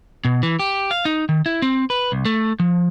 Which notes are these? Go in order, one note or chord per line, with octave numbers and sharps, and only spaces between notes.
B2
E3
G4
F5
D#4
D#3
E4
C4
B4
C2
A3
F3